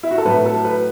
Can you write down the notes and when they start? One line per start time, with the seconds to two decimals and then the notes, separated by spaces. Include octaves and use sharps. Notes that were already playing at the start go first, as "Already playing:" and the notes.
0.03 E4
0.11 F#4
0.18 A4
0.25 A2 F#3 A3 B4
0.46 A4
0.65 B4